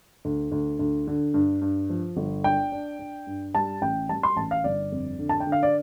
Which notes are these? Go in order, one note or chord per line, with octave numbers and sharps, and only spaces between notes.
D2
D2
D2
D3
G2
G2
F3
G1
D4 G5
D4
D4
G2
G3 A5
A1 G5
G3 A5
C6
A1 A5
F5
G1 D5
F2
D3
A5
G5
D3
F5
D5